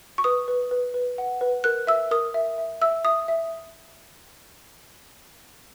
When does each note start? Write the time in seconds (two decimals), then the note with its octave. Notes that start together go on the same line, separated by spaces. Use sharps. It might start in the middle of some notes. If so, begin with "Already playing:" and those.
0.18 C#6
0.24 B4 D#6
0.48 B4
0.71 B4
0.94 B4
1.18 F#5
1.41 B4
1.64 A#4 F#6
1.87 E5 E6
2.11 A#4 D#6
2.34 E5
2.58 E5
2.81 E5 E6
3.05 E5 D#6
3.28 E5